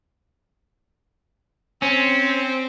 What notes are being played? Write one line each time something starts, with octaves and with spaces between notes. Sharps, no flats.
C4 C#4